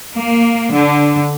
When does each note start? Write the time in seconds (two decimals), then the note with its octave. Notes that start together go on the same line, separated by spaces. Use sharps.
0.14 A#3
0.73 D3